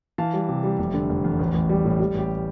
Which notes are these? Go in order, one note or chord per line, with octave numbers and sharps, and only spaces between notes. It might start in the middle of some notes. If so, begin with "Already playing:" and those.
E3 F5 A5
G3
C3
G3
F1
D3
F1
E2
A1
A1
G3
A2
G3 G4
A1 G4